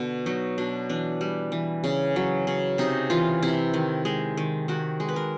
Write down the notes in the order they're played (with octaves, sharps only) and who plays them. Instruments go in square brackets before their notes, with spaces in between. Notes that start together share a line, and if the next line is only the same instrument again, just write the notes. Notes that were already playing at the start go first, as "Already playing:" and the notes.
Already playing: [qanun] B2 D3
F#3 D#4
B2 D4
E3 D4
G3
E3
C#3
F#3
C#3
C3 D#4
E3 F4
C3 E4
D#3
G#3
D#3
D#3 F#4
G#3
B4
A#4